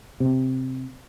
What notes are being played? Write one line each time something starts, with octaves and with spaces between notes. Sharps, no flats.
C3